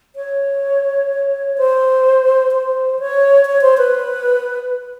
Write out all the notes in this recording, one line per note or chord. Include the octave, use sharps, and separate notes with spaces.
C#5
C5
C5
C#5
C#5
C5
B4